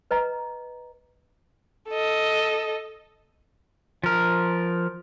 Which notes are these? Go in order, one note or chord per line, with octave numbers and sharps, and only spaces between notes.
B4 D#5 A#5
A4 D#5
F3 A#4